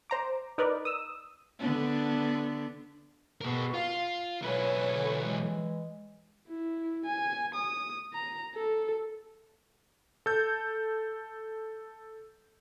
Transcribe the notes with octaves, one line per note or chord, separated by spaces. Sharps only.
C5 A#5 D6
D#4 A#4 B4 D5
D#6 E6
D3 B3 D4
B2 G#4 A#4
F4 F5
B1 E4 B4 C#5 G#5
D3
E3 G#3
E4
G#5
D#6
A#5
A4
A4 G6